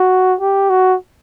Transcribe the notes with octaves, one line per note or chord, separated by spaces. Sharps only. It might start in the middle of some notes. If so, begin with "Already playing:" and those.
Already playing: F#4
G4
F#4